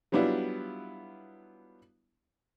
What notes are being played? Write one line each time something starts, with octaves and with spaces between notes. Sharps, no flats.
F#3 G3 B3 D4 E4 F4